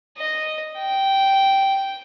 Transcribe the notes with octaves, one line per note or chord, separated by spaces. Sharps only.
D#5
G5